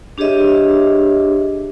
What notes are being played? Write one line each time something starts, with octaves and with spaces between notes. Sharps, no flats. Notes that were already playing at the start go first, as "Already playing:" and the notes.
D4 G4 G#4 C#5 D#5 E5